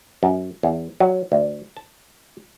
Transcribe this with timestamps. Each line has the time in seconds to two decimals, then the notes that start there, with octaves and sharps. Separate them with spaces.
0.23 F#2
0.63 E2
1.00 F#3
1.32 D2
1.77 A5